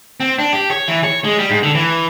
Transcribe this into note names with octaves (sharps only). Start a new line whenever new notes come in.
C4
D4
G4
C#5
E3
C#5
G#3
G3
G#2
D3
E3